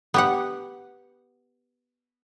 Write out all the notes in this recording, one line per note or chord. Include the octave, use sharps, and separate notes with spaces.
B3 G4 F#5